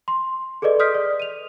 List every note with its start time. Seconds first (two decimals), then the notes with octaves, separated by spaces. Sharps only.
0.08 C6
0.62 G#4 A4 B4 D5 D#5
0.79 C6 D#6 F6 G6 B6 D7
0.94 D5
1.20 D#7 F7